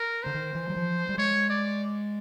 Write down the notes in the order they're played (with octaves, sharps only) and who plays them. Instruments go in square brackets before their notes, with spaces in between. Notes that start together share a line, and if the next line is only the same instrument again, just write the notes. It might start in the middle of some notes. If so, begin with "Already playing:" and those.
Already playing: [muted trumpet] A#4
[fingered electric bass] D3 [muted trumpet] C5
[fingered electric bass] D#3
E3
F#3
F3
G3
[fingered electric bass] G#3 [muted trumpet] C#5
[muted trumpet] D5